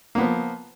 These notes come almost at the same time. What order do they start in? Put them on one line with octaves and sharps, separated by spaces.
A#3 B3 F3